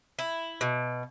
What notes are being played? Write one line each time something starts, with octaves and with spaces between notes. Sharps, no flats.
E4
B2